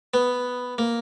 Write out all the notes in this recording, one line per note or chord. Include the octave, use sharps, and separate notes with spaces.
B3
A#3